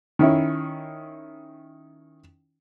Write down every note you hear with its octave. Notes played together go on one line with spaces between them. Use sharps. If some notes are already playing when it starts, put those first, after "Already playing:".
D#3 C#4 E4